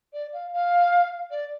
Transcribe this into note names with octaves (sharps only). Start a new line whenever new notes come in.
D5
F5
F5
D5